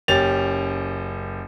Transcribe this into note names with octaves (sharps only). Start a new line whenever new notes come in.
F#1 C#4 G4 A6 F7